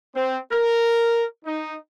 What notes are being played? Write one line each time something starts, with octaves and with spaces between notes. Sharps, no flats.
C4
A#4
D#4